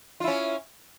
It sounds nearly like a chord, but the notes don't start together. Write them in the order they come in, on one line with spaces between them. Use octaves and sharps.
F4 E4 C#4